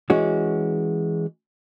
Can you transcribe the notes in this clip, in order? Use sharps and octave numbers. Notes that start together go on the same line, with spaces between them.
E3 G#3 C#4 F#4